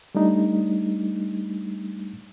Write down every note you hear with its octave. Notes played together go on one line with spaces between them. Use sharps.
G3 A3 D4 D#4